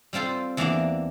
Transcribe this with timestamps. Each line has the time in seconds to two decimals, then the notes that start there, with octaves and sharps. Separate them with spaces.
0.13 G3 C4 F4 A4 C5
0.57 E2 E3 A#3 D4